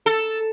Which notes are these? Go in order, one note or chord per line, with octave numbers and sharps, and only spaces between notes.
A4